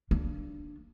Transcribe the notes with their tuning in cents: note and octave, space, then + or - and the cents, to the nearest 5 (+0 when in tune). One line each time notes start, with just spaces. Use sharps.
A#3 -15 D4 +0